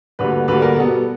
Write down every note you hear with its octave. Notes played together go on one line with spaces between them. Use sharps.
D2 D3 G3 A#3 B4
D2 D3 G3 A#3 B4
A#4
B2 G3 B3 A4